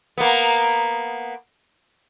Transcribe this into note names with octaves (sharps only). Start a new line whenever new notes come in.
A#3 B3